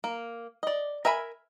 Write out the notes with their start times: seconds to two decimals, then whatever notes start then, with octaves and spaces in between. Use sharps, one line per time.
0.04 A#3
0.63 D5 D#5
1.05 A#4 E5 G#5 B5